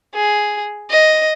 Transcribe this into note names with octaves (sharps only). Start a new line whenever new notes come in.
G#4
D#5